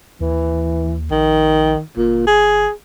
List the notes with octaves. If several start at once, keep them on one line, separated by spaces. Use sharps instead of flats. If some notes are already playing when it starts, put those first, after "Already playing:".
D#2 E3
A#1 D#3
G1 A#2
G#4